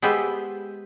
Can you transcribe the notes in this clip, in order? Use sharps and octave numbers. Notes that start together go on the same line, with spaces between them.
G#3 B3 G4 B4 C5 E5